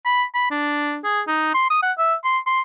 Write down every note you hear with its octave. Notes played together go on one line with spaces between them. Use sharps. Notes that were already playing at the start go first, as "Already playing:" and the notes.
B5
B5
D4
G#4
D#4
C6
D#6
F#5
E5
C6
C6